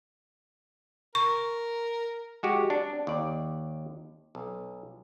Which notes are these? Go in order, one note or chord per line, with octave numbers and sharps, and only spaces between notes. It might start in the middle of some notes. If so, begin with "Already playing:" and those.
A#4 C#6
G#3 F#4 G4
D4
D#2 D5
B1